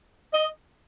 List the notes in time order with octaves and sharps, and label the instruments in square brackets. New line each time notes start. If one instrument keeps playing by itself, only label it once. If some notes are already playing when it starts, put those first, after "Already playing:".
[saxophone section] D#5